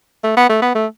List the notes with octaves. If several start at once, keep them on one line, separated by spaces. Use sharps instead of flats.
A3
B3
A3
B3
A3